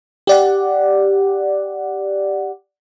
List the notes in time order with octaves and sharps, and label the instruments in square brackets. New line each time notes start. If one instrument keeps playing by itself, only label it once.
[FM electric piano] G4 D5 F#5